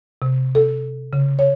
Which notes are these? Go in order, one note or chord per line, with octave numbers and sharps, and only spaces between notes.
C3
A4
C#3
C#5